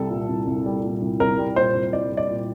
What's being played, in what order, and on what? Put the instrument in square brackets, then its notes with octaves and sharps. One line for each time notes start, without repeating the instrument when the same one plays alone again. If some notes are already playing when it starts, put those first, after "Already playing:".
Already playing: [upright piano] C2 G3 [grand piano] A4
[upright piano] A#2
C2
C2
G3
A#2
C2
[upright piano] C2 [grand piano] A#4
[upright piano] G3
[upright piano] A#2 [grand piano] C5
[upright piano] C2
[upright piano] C2 [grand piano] D5
[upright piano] G3
[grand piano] D5
[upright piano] A#2